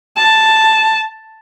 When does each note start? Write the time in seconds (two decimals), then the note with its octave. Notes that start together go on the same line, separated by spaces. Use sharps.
0.17 A5